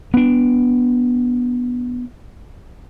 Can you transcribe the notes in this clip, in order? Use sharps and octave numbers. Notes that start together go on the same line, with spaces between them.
B3 D4